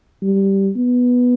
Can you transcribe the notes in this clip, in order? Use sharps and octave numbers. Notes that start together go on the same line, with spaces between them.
G3
B3